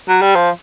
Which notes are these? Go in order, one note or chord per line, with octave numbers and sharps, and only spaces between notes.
F#3
G3
F3